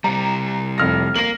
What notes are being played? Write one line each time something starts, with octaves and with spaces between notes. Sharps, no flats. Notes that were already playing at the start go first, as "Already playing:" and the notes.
C3 G3 A#5
F1 F6 A#6
A#3 A#4 A#6 F#7